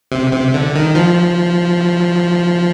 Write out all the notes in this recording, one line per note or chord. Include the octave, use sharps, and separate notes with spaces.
C3
C3
D3
D#3
F3